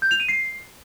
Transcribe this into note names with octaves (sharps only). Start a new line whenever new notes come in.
G6
F7
D#7
C7